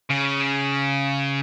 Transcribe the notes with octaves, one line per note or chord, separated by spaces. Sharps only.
C#3